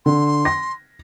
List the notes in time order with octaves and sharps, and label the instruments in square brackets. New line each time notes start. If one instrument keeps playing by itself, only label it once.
[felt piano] D3 [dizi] C6
[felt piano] A#6